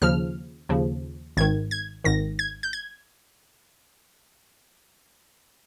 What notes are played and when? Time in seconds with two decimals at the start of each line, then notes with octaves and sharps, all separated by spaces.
0.01 D#2 C#3 F3 F6
0.69 D#2 C#3 F3
1.37 G#1 G#2 D#3 G#6
1.71 G#6
2.04 G#1 G#2 D#3 A#6
2.39 G#6
2.63 G6
2.73 G#6